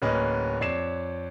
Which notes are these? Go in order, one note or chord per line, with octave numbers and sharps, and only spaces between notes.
D1 A#3 C#4 B4 D#5
F2 C#5 D5 C7 E7